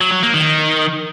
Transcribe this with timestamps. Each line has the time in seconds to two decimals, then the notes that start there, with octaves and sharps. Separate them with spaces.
0.01 F#3
0.12 F#3
0.23 A#3
0.34 D#3